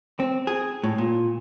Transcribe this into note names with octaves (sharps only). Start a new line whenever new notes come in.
C4
G#4
A2
A#2